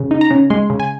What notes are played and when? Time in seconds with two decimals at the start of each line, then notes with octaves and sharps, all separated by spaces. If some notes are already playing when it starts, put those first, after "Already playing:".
Already playing: C#3
0.11 D#4
0.21 A#5
0.31 C#3
0.50 G#3 C6
0.70 C#3
0.80 G#5